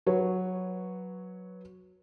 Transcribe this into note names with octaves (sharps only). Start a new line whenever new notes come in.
F#3 B4 C#5